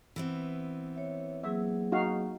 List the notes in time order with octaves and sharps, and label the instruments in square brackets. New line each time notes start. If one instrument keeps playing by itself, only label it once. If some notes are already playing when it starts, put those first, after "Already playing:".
[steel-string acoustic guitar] E3 B3 C4
[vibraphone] C#5 E5
[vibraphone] F#3 A#3 G#4 [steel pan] E5
[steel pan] D#4 F#4 F5